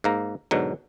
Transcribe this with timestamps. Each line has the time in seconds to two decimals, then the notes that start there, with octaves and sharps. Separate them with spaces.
0.04 G#2 A#3 A#5
0.51 G#2 B2 D3 F#3